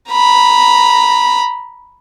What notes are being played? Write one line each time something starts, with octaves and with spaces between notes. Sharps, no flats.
A#5 B5